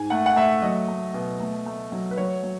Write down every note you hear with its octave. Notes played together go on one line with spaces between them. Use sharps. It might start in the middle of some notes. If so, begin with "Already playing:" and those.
Already playing: G#2 G#5
A3 F#5
F#5
A3 E5
F#3 D#5
A3
B2
A3
A3
F#3
B4
F#3 C#5
F#3